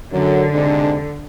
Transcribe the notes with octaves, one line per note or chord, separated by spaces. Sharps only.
F#2 D3 F#3
G#2 C3 D4